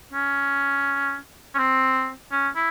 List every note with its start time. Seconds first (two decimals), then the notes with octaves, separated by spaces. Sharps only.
0.13 C#4
1.55 C#4
1.59 C4
2.32 C#4
2.56 E4